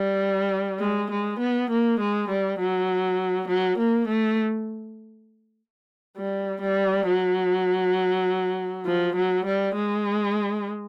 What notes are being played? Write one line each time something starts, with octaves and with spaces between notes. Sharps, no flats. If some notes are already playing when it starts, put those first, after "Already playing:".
Already playing: G3
G#3
G#3
B3
A#3
G#3
G3
F#3
F#3
A#3
A3
G3
G3
F#3
F3
F#3
G3
G#3